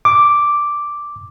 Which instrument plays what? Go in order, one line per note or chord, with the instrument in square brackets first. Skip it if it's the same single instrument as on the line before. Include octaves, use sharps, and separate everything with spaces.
[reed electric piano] D6